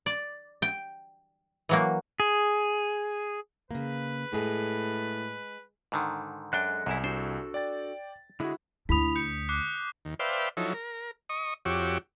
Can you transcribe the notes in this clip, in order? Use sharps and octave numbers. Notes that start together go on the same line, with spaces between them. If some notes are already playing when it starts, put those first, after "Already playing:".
D5
G5
E3 F#3 A#3
G#4
C#3 A#3 B4
A2 G#3 G#4
G#2 D3 D#3
F#2 G#3 D4 A4 G5 F#6
C2 F#2 E4 G#5 E7
D4 F#4 A4 C5
D5 G5 A6
D3 G#3 E4 F#4 G#4
D2 D3 E4 B5 D#6 B6 F7
G6 C#7
D6 F#6 C7
D#2
B4 C5 D5 E5 F5 G5
F3 F#3 D#4 E4 A4 C#5
A#4
D#5 C#6 D#6
F2 F#4 G4 C#5 D6 E6